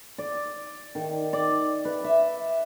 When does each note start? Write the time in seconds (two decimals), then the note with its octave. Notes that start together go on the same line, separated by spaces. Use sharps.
0.18 D5
0.95 D#3
1.33 D5
1.85 B4
2.04 E5